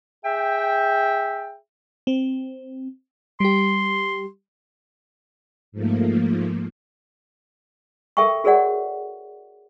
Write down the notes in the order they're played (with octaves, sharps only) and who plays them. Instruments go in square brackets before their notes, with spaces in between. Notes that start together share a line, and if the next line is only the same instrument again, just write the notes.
[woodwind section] G#4 E5 G5
[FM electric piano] C4
[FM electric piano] G3 G4 [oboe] C6
[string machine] G#2 F3 A3 A#3
[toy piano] A4 A#4 E5 G5 A5 C#6
F#4 G#4 A#4 C#5 D5 F#5